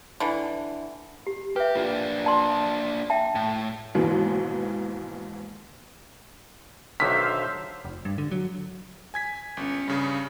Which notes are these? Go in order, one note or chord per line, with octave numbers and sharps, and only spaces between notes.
D3 E3
G4
G4 B4 E5
A#3 D4 F4
D5 A5 C6
E5 G5 A5
A2
D#2 G#2 B2 E3
B1 D3 D#3 C5 E5 F5 B6
F1
G2
D3
F#3
G#5 G#6 B6
G1 C#4
G2 C#3 G#4